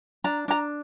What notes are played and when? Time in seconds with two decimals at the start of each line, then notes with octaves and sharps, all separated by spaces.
0.24 D4 A#5
0.48 D4 A#5